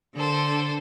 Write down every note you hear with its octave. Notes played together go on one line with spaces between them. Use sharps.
D3 A4 C5